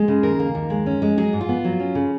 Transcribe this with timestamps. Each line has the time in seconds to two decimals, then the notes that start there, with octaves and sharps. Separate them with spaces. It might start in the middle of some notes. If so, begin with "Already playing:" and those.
Already playing: G#3
0.08 C#3
0.23 D#2 A#4
0.40 A#3
0.55 D#2
0.70 G#3
0.86 C#4
1.02 G#3
1.17 F#3 G#4
1.33 G#2
1.41 F4
1.49 B3
1.64 F#3
1.80 C#4
1.95 C#3